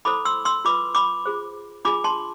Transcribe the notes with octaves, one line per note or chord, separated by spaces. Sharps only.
E4 A4 C5 B5 D6
C6 E6
C6 E6
F4 B4 B5 D6
B5 D6
F4 G#4 C5
D4 F4 G#4 B5 D6
A5 C6